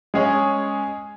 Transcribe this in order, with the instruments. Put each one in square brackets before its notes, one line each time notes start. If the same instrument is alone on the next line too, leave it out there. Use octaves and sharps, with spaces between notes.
[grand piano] G#3 C#4 G#4 C#5